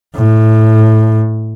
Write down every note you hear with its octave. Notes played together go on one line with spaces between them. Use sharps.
A2